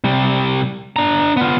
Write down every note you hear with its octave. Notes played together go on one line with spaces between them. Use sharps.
C3 G3
D4 A#5
B3 F4